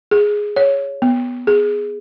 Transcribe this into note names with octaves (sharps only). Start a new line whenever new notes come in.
G#4
C#5
B3
G#4